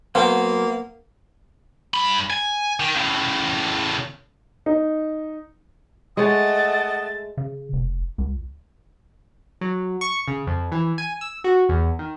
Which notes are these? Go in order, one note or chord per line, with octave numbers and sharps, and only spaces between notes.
F#3 A#3 B3 C5 F5 F#5
G2 B5
G#5
D#3
A2 C#3
D#4
G#3 A3 C#5 D#5 F#5 A6
C#3
F1
C#2
F#3
C#6
C#3
F2
E3
G#5
E6
F#4
E2
D#3